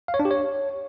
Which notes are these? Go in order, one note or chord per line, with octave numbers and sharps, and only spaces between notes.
F5
C#5
D4
G4
C#5